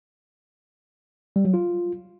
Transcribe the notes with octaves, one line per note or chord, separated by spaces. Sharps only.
G3
F#3
F4